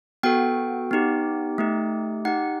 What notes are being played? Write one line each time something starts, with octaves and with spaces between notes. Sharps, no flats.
B3 F#4 A4 G5
B3 D#4 G4
A3 D#4 G4
D#4 G4 F#5